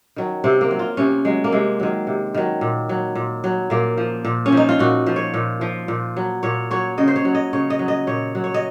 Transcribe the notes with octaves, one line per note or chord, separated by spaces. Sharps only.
D#3 F#3
C3 C4
A#3
F#3
F4
C3 C#4
F#3 G#3
A#3
C3 G#3
D#3 F#3
C3
D#3 F#3
A#2
F#3
A#2
F#3
A#2 A#3
F3
A#2
C#4
F3 D#4
F4
A#2 F#4
F3
C#5
A#2
F3
A#2
F#3
A#2 C#5
F#3 C#5
C#3 D#5
C5
C#5
F#3
D#5
C#3 C#5
D#5
F#3
D#5
A#2 C#5
F#3
C#5
D#5